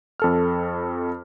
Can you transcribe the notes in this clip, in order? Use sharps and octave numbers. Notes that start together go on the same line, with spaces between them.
F2 A4 F6